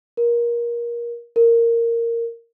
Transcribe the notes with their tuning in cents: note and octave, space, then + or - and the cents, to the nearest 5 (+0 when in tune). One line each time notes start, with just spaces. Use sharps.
A#4 +25
A#4 -10